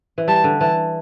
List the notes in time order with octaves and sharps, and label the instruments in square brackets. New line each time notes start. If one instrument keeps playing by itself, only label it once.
[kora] E3
[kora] G3 [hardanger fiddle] A5
[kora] D3
[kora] E3 [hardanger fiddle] A5